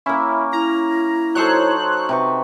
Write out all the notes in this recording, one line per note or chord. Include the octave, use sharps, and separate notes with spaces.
A#3 C#4 E4
E4 A#5
F#3 D#4 A4 C5 C#5 F#6
C3 B4 C#6